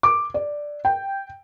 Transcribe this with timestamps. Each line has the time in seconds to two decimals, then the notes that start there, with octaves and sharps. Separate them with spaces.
0.03 D6
0.34 D5
0.85 G5